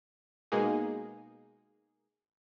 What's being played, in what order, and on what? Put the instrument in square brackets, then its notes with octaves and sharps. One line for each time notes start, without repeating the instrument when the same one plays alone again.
[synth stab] B2 G#3 A#3 D#4 G#4